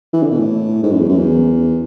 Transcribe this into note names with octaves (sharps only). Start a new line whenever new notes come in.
E3
D3
B2
A2
G#2
F#2
E2
F#2
E2